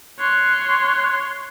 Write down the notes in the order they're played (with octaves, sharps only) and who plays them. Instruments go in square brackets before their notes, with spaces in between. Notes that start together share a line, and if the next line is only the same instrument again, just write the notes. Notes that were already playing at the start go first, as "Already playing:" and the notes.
[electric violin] C#5 C6 [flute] F#6